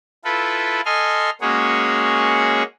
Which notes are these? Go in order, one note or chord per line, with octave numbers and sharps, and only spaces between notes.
E4 F4 A4 B4
A4 D#5 G#5 C6 F6
G#3 A#3 C#4 F#4 G#4 C#5